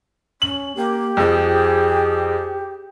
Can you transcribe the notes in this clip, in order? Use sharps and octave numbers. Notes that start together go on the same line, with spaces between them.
C#4 F#7
A#3 G4
F2 F3 G#4